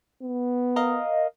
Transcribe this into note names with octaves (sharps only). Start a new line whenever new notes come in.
B3
A#4 D#5 F5